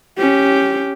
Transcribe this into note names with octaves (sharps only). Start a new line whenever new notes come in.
C#4 G4